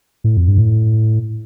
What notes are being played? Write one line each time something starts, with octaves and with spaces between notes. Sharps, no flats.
A2
F2
G2
A2